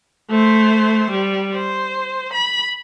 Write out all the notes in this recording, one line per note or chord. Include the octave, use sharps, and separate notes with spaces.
A3 C5
G3
C5
B5